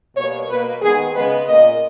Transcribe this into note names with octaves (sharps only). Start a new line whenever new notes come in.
B2 G3 A#3 C#5
B2 A#3 B4
D#3 G#3 B3 G#4
C#3 G#3 B3 B4
A#2 A#3 D#5